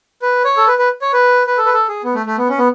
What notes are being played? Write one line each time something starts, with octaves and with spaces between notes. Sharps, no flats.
B4
C#5
A4
B4
B4
C#5
B4
B4
A4
B4
A4
G#4
B3
A3
A3
B3
C#4
B3